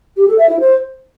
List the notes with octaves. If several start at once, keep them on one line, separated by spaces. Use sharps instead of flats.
G4
A4
E5
E4
C5